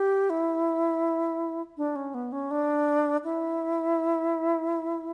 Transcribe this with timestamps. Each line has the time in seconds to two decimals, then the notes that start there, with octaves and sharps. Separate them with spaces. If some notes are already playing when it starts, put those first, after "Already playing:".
Already playing: G4
0.30 E4
1.77 D4
1.96 C#4
2.14 B3
2.32 C#4
2.51 D4
3.24 E4